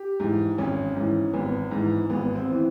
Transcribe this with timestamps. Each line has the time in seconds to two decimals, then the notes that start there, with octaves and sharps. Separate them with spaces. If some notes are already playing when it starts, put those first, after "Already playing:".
Already playing: G4
0.20 G#2 E3
0.58 G#1 C#4
0.95 G#2 E3
1.33 G#1 B3
1.71 G#2 E3
2.10 G#1 B3
2.35 C4
2.50 E3